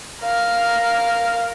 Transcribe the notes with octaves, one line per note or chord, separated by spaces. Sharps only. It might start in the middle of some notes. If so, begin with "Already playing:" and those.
A#4 F5